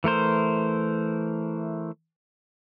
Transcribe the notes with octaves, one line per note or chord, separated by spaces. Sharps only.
E3 A3 A#4 C5